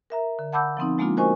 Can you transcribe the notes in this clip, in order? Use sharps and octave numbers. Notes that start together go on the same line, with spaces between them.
A#4 E5 A#5
D3
F#5 A5 B5 D6 E6 G6
F3 B3 C4 D#4
F3 G#3 A#3 B3 D4 F4
F#4 A#4 C5 D#5 G#5 C#6